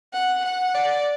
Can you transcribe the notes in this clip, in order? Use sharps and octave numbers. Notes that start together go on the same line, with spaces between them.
F#5
F#5
D5